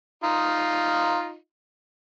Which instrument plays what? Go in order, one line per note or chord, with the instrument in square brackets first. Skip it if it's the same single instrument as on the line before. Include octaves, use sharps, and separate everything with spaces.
[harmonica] D#4 F4